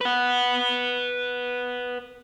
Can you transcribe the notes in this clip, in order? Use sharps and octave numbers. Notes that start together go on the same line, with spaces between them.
B4 F#5